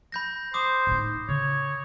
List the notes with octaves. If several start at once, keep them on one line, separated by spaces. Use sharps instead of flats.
B5 G6 A#6
C5 D6 D#6
A2 D#4
C#3 C#5